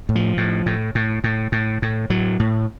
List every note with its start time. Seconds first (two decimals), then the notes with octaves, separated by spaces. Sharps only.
0.09 A2
0.15 F3
0.37 A2
0.66 A2
0.95 A2
1.24 A2
1.52 A2
1.82 A2
2.10 A2 F#3
2.40 A2